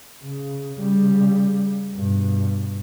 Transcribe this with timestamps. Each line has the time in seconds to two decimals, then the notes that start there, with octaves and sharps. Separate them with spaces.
0.24 C#3
0.81 C#3 G3
1.94 G2 B2